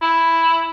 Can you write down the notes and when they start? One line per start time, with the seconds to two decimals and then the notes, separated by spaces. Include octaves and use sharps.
0.02 E4